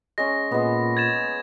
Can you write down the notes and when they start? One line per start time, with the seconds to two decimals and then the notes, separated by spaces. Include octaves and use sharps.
0.18 G#3 C#4 A#6
0.51 A#2 G#3 B3
0.97 G#6 A6 E7